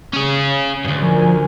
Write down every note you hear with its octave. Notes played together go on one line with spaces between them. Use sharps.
C#4 G#4
D2 G2
F3 A#4 G#5